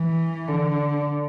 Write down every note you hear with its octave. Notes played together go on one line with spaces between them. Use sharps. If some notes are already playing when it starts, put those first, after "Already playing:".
Already playing: E3
D3